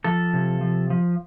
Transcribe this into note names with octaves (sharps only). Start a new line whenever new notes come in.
F3 A4
C3
F3
F3